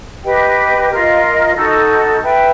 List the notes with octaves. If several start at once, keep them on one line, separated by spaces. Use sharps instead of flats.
G4 B4 D#5 G5
F4 A#4 D#5
D#4 F#4 A4
B4 E5 G5